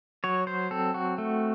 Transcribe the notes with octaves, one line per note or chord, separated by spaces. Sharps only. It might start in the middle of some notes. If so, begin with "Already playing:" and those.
F#3 C#5
C5
C4 A4
F#4
A3